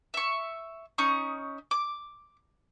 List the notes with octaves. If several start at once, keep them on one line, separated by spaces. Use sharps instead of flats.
E5 C#6
C#4 D#4 C#6 D#6
D6